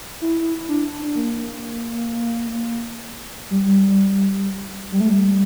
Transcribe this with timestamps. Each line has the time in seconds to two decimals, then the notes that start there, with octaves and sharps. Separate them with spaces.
0.21 E4
0.68 D4
1.15 A#3
3.51 G3
4.92 G3
5.00 A3
5.09 G3